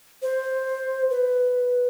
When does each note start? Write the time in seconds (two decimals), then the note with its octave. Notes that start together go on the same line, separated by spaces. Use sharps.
0.22 C5
1.10 B4